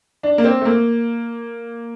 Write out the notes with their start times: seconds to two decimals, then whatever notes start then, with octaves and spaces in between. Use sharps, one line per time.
0.23 D4
0.38 A#3
0.45 C4
0.61 A3
0.65 A#3